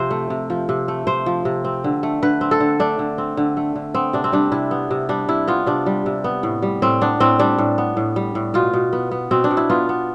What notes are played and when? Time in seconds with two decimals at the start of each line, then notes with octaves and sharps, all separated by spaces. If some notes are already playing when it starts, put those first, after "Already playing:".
Already playing: C3 F3 C5
0.11 A3
0.30 C3
0.50 F3
0.69 C3
0.88 A3
1.07 C3 C5
1.26 F3
1.45 C3
1.64 C4
1.84 D3
2.03 A3
2.23 D3 B4
2.41 C4
2.51 A4
2.60 D3
2.79 A3 D4
2.99 D3
3.18 C4
3.37 D3
3.57 A3
3.75 D3
3.94 B3 C4
4.13 C3 D4
4.24 C4
4.32 G3 D4
4.52 C3 E4
4.71 B3
4.91 C3
5.09 G3 D4
5.28 C3 E4
5.48 B3 F4
5.66 C3 D4
5.86 G3
6.06 C3
6.24 B3
6.43 A2
6.62 G3
6.82 A2 C4
7.01 B3 D4
7.20 A2 C4
7.39 G3 D4
7.58 A2
7.78 B3
7.97 A2
8.16 G3
8.35 A2
8.54 B2 F4
8.73 B2
8.93 B3
9.11 B3
9.31 B2 C4
9.44 D4
9.51 B2
9.57 E4
9.70 B3 F4
9.89 B3